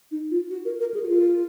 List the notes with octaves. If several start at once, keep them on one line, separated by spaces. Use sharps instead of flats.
D#4
F4
F#4
A#4
A#4
G#4
F#4
F4